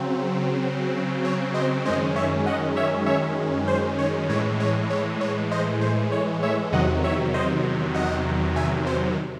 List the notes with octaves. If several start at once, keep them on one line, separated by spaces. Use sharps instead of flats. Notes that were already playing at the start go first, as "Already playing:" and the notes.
Already playing: C#3 F#3 C4
C#5
C5 D#5
F#2 D#3 G#3 C#4 C5 D#5
C#5 E5
D#5 F#5
C#5 E5
C#5 E5
C5
C#5
A2 E3 G#3 C#5
C#5
C#5
C#5
C5 D#5
C5
C#5
C#5 E5
E2 C3 D#3 F#3 D#5 F#5
C#5 E5
C5 D#5
D#5 F#5
E5 G#5
C5